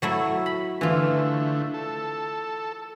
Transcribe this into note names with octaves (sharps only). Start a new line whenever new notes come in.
F#3 A3 E4
B5
D3 E3 A3 F4
A4